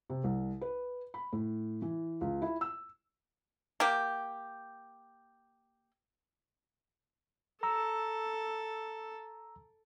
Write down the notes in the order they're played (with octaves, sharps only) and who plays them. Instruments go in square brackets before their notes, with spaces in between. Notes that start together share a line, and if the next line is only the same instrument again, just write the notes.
[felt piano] C3
C2
B4
B5
A2
E3
C#2
E4
E6
[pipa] A#3 G4
[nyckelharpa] A4 [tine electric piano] A#5 E6